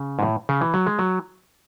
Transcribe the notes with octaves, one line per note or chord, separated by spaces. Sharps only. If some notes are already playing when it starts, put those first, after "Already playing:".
Already playing: C#3
G#2
A2
C#3
E3
F#3
G#3
F#3